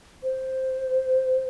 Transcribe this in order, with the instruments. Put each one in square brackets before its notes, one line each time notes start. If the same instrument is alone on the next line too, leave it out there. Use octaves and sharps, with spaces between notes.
[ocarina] C5